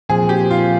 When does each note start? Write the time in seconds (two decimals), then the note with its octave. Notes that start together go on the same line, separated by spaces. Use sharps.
0.09 A#2 F3 C4 G#4
0.29 G4
0.51 F4